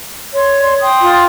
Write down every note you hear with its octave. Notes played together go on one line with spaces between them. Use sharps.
C#5 C6
D5 C6
G5 C6 D#6
F4